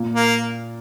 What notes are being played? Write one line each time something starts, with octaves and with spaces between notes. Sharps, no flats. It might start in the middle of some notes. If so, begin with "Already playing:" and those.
Already playing: A#2
A#3